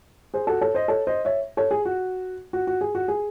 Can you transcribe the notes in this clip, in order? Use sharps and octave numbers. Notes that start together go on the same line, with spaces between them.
G#4 C5
F#4 A4
A4 C#5
C5 D#5
A4 C#5
C5 D#5
C#5 E5
A4 C#5
G#4
F#4
F#4
F#4
G#4
F#4
G#4